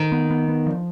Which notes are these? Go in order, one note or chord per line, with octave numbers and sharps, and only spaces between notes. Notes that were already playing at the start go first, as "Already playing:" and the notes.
Already playing: D#3
B3
B3
B3
F3